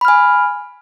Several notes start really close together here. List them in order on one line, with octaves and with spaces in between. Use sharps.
B5 F6 G#5